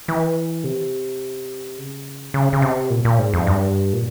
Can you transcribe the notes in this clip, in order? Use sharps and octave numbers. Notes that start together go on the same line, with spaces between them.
E3
C3
C#3
C#3
C#3
C3
A#2
A#2
G#2
F2
G2
A#2